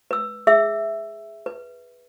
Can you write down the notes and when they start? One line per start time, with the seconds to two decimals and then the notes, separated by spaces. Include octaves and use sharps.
0.11 B4 E6
0.47 G#4 E5 E6
1.46 B4